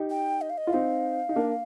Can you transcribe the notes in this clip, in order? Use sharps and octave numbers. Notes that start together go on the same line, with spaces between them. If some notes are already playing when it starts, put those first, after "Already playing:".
Already playing: D#4 G4
G5
D#5
F5
D#5
F4
C4 D#4 F5
D#4
A#3 D4